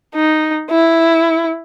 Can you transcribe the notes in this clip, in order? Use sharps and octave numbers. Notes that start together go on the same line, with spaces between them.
D#4
E4